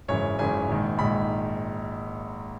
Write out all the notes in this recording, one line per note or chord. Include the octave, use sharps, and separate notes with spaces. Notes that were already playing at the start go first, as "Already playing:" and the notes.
G#1 F#2 C#3 E3 C#5
G#1 F#2 C#3 E3 G#5
A#1 G#2 D#3
A#1 G#2 D#3 B5